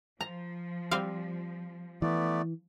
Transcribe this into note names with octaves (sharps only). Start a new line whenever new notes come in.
F3 A#5
G3 C4 F5
E3 A3 B3 D5